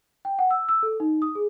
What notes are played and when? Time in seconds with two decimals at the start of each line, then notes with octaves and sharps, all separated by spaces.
0.25 G5
0.39 F#5
0.51 E6
0.69 E6
0.83 A4
1.00 D#4
1.22 D#6
1.35 G#4